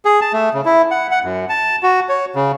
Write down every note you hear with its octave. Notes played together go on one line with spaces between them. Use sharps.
G#4
A5
A3
C#3
E4
F#5
F#5
F#2
A5
F#4
C#5
C#3